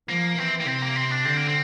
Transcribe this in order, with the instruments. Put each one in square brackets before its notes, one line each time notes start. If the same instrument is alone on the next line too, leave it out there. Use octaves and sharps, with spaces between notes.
[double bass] F3 [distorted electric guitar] A#3
[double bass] E3 [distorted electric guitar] C4
[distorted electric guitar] A#3
[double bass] C3 [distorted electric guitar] C4
[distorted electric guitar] A#3
C4
D4
[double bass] D3 [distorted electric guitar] C4
[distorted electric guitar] A#3
C4